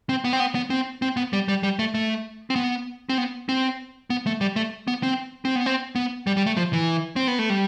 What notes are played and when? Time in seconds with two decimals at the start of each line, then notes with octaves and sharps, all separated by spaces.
0.09 C4
0.24 B3
0.33 C4
0.40 B3
0.55 B3
0.70 C4
1.02 C4
1.17 B3
1.33 G3
1.48 G3
1.63 G3
1.79 A3
1.94 A3
2.50 C4
2.56 B3
3.09 C4
3.18 B3
3.49 C4
4.10 B3
4.26 A3
4.41 G3
4.56 A3
4.88 B3
5.03 C4
5.45 C4
5.55 B3
5.66 C4
5.95 B3
6.27 G3
6.37 G3
6.46 A3
6.57 F3
6.73 E3
7.16 C4
7.27 B3
7.39 A3
7.50 G3